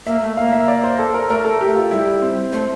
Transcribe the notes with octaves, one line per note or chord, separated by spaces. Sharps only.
A#3 E5
A3
A#3 F5
E5
D5
C5
A4
A#4
A3 A#4
A4
G4
F4
G3 E4
C4
A3 C5